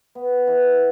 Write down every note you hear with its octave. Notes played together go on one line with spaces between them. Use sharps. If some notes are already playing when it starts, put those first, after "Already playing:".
B3
E3